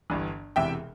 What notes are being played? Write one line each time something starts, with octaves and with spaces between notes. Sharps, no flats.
G1 G2 E3
E1 E2 C3 E3 E5 G5